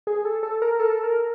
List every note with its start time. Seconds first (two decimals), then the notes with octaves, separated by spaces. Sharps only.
0.07 G#4
0.25 A4
0.43 A4
0.62 A#4
0.79 A4
1.03 A#4